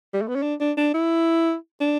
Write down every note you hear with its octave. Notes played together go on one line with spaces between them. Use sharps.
G3
A3
B3
C#4
D4
D4
D4
E4
D4